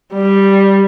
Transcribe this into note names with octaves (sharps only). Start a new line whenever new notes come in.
G3